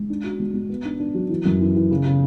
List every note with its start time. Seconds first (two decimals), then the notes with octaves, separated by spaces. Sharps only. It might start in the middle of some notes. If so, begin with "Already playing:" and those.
Already playing: G#3
0.10 D4
0.24 F#4
0.40 G#3
0.54 G#3
0.69 B3
0.85 D4
1.00 D4
1.15 F#3
1.30 E3
1.45 F#2
1.61 E3
1.76 E3
1.91 C#3
2.05 C#3